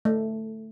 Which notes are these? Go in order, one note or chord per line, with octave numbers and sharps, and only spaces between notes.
A3